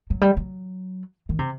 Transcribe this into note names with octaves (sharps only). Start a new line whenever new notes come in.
F#3
G3
F#3
D#3
C3